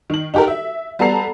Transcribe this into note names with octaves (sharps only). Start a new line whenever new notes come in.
D#3 F#7
D#4 F#4 G4 A4 A#4
E5
G3 B3 A4 A5 A#5 C7